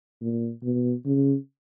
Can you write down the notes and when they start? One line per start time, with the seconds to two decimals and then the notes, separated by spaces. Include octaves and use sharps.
0.21 A#2
0.63 B2
1.06 C#3